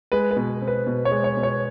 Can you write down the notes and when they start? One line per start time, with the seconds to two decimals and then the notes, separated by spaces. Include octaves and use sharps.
0.12 G#3 B4
0.31 B4
0.36 B2
0.62 C4
0.68 B4
0.87 B2
1.05 C#5
1.11 G#3
1.24 C#5
1.37 B2
1.43 C#5